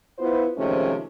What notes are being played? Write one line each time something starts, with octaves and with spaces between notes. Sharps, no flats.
B3 E4 F4 C5
C3 D#3 F3 G#3 A3 C#4